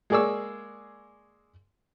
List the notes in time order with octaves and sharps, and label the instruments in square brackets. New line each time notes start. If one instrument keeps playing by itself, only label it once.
[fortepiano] G#3 A#3 G#4 D5 C#6 E6